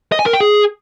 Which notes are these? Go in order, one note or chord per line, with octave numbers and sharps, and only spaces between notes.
D#5
G#5
A#4
G5
G#4